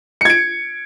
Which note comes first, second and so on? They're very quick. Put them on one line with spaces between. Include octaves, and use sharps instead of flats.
C#7 G#6 D7